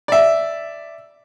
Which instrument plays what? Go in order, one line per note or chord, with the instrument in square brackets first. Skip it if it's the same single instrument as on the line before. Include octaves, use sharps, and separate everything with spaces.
[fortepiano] D5 E5